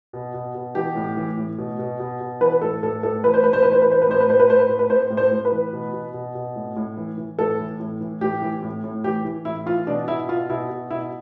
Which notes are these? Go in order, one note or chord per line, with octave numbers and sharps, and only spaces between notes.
B2
B2
B2
E3 G4
A2
E3
A2
B2
B2
B2
B2
E3 B4
A2 A4
A2 A4
A2 A4
E3 B4
C5
A2 B4
C5
E3 B4
C5
E3 B4
C5
B4
A2 C5
B4
A2 C5
B4
A2 C5
B4
A2
B4
A2 C5
A2
C5
A2
B4
E3
B2
B2
B2
B2
A2
A2
E3
E3
A2 A4
E3
A2
E3
A2 G4
E3
A2
A2
E3 G4
E3
A2 E4
E3 F4
B2 D4
B2 E4
B2 F4
B2 E4
B2
B2 E4